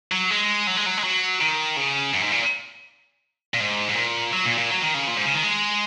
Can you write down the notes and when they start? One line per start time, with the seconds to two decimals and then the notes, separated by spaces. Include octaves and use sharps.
0.12 F#3
0.31 G#3
0.67 F#3
0.77 G#3
0.86 F#3
0.98 G#3
1.04 F#3
1.41 D#3
1.77 C#3
2.14 F#2
2.23 G#2
2.32 A#2
3.54 A#2
3.60 G#2
3.90 G#2
3.96 A#2
4.33 F#3
4.46 A#2
4.58 A#2
4.71 F#3
4.82 D#3
4.94 C#3
5.07 A#2
5.16 G#2
5.25 C#3
5.34 D#3
5.43 G#3